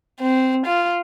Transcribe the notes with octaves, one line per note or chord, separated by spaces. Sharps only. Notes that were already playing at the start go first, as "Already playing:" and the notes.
C4
F4